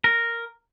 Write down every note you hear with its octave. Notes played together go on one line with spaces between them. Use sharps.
A#4